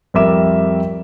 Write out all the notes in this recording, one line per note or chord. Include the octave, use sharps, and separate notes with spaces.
F2 G3 A#4 E5 D6 E7